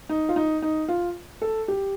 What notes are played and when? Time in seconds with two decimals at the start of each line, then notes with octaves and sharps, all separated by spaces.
0.09 D#4
0.29 F4
0.36 D#4
0.62 D#4
0.88 F4
1.42 A4
1.68 G4